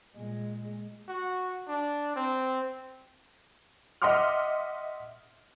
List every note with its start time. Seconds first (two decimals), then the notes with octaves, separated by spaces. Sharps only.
0.14 A#2 G#3
1.09 F#4
1.68 D4
2.16 C4
4.02 D#5 E5 F#5 C6 D6 F6